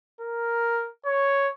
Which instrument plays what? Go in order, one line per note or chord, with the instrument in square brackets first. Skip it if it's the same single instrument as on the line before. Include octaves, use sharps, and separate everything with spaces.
[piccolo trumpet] A#4
C#5